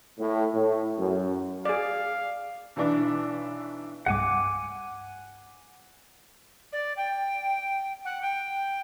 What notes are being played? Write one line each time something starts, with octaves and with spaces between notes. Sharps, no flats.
A2
A2
F#2
G#4 D5 F5
B1 E3 D4 D6
C2 G2 F#5 G#5 D6
D5
G5
F#5
G5